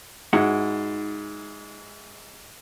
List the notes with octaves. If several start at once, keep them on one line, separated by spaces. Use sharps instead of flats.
G#2 D#4 E4 F#4 F#5